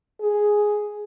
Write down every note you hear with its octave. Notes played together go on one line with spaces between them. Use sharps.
G#4